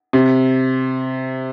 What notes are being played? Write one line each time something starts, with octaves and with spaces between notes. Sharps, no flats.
C3